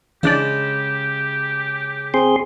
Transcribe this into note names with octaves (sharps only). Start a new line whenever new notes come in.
C#3 E3 G#3 D4 G4 D5
C4 G#4 C6